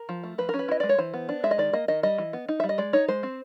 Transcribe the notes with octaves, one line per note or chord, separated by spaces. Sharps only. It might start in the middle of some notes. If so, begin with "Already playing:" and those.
Already playing: A#4
F3
A3
F3 B4
C#4 A#4
B4
E4 D#5
G#3 D5
C#5
E3 C5
B3
D4
G#3 E5
D#5
D#3 D5
A#3 D#5
D#3 D#5
G3 D#5
E3
B3
D#4
G3 E5
D#5
G#3 D5
D#4 C#5
G#3 C5
C4